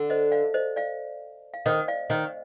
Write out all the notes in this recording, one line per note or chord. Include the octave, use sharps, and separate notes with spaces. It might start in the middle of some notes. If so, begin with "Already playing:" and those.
Already playing: D3
C5 D#5
D5 F5
C5 D#5
D5 F5
F5
D#3 C5 D#5
D5 F5
D#3 C5 D#5